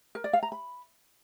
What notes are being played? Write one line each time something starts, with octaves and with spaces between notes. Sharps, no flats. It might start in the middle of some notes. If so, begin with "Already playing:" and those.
A#4
D5
F5
A#5
B5